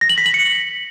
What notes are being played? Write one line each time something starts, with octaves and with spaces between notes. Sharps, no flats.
A#6
F#7
B6
F#7
C#7